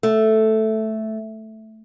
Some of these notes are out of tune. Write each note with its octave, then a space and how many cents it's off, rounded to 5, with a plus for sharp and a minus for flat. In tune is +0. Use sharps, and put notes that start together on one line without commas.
A3 -5